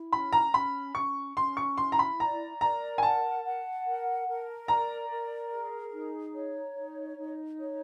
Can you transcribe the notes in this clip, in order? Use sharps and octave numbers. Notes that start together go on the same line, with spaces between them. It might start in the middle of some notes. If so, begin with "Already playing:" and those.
Already playing: E4
C#4 B5
A#5
C#4 B5
C#4 C#6
C#4 C6
C#6
E4 C6
A#5
B5
D5 A#5
A#4 A#5
G#5
F#5 A5
F#5
A#4
A#4
D5 A#5
A#4
G#4
D#4
C#5
D#4
D#4
C#5